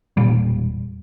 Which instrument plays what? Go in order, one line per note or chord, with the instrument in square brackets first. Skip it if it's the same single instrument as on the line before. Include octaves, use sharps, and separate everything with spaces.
[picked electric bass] E1 A#2 G3